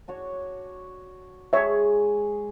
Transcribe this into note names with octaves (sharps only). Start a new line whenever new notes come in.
D4 F#4 C#5
G#3 G#4 C#5 E5